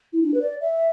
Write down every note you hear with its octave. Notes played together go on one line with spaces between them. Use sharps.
E4
D4
B4
D5
E5